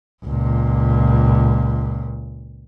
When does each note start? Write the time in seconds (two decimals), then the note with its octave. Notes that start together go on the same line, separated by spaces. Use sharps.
0.25 C#2 A#2